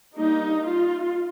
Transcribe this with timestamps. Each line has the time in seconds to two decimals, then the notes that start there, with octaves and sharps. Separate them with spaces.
0.16 G3 A#3 D4 D#4
0.66 F4